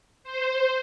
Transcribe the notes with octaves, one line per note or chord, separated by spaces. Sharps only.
C5